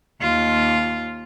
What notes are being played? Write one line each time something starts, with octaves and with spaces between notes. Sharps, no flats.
D#2 F4